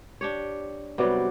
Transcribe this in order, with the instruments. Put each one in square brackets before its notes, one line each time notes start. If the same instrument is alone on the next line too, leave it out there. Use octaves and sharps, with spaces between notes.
[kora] D4 G4 C#5
[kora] C3 F#3 G3 [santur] B3 F#4 D5